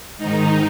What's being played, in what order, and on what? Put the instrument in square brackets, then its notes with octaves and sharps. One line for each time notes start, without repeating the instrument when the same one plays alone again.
[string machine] G#2 D#3 D#4